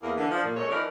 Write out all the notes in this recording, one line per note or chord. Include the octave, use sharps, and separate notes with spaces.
E2 A#3
D3 E3
F3 D4
A#2
F#2 G#3 A4 C#5
E3 F3 D#4 A#4 B4 D5